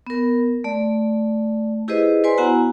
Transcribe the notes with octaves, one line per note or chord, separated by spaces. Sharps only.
B3 A#4
A3 D5
E4 G4 G#4 B4 C5 D#5
B4 C5 D5 G#5 C6
B3 E4 F#4 F#5 G#5 A#5